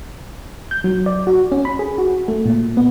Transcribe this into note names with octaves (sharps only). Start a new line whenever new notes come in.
G6
F#3
D5
F#4
C#4
B5
G#4
F#4
A3
A#2
B3